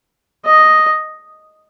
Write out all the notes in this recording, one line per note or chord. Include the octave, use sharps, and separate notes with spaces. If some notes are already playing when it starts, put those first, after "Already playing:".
D#5